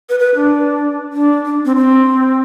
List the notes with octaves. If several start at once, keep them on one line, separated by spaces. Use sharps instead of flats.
B4
B4
D4
D4
D4
C4
C4